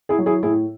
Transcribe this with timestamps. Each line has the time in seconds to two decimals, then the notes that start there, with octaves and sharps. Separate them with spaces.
0.09 E4 G#4
0.18 F#3
0.26 E4 G#4
0.43 A2 E4 G#4